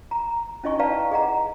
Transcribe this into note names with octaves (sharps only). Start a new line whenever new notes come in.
A#5
C#4 D#4 E4 D#5 G#5 C#6
B4 D5 F5 G5 A5 A#5
G#4 D#5 F#5 A#5